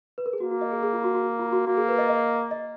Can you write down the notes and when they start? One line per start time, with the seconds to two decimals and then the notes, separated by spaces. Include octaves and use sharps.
0.18 B4
0.26 A#4
0.33 G#4
0.40 A#3 F#4
0.51 F#4
0.61 D#5
0.72 G#4
0.83 G#4
0.93 F4
1.04 F#4
1.15 F#4
1.39 F4
1.53 F#4
1.67 A#3 F#4
1.77 G#4
1.88 B4
1.98 D#5
2.09 D#5
2.51 D#5